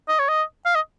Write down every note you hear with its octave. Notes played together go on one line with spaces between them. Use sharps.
D#5
C#5
D#5
F5
D#5